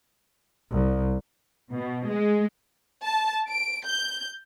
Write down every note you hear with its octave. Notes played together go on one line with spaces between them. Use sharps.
C2
B2
G#3
A5
D7
G6